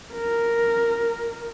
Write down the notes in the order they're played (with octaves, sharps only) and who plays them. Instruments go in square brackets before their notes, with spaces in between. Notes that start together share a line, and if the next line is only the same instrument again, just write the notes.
[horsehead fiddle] A#4